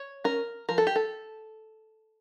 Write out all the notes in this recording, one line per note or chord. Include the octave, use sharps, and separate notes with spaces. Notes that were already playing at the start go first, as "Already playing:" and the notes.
Already playing: C#5
C#4 A#4
F3 A#4
A4
G4
A4